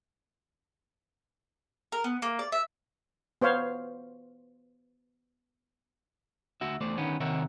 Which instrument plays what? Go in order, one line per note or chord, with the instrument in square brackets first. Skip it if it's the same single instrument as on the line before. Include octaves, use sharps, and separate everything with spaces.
[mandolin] A#4
B3
A#3
D5
E5
[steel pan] B3 C5 C#5 F5
[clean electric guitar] D2 F#4 E5
E2 A3 C5 D5
D3 D#3 B3 C#4
C3 D#3 A#4 C#5 E5 F#5